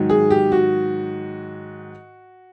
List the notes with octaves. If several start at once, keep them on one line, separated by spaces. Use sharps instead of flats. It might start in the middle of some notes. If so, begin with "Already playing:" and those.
Already playing: G#2 D#3 F#3
G#4
G4
F#4